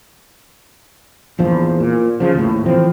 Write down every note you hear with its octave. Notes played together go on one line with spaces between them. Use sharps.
A#1 E2 F3
A#2
C#3 F3
D#2 A2
E3 F3 C4